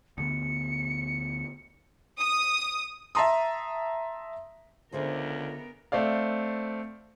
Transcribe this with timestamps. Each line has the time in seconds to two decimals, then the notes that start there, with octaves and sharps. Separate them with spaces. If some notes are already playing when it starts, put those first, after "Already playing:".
0.18 D2 D3 B3 C#7
2.19 D#6
3.15 E5 A5 A#5 C6 D#6
4.92 C#2 D3 B3 G#4 A#4 C5 E5
5.92 A3 C4 D5 F5